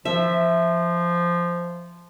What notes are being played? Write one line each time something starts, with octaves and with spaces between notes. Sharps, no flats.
F3 E5